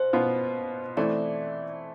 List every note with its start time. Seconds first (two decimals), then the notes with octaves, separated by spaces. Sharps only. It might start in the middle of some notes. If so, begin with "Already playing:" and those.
Already playing: B2 C5
0.13 B2 B3 F4
0.97 E3 A3 C4 E4 D5